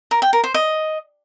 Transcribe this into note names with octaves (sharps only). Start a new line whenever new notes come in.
A#4
G5
A#4
C5
D#5